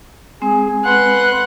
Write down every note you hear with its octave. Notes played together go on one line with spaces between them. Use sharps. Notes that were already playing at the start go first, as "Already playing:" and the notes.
G#3 C4 G#4 G#5
B4 F#5 C6 F#6